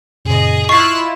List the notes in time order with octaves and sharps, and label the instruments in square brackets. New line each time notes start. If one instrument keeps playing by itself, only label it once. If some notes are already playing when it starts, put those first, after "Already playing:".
[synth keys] F#2 A#2 C#3 [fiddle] G#4 D#5
[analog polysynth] E4 F4 [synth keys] D#5 [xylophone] C#6 C7 [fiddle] E6 F#6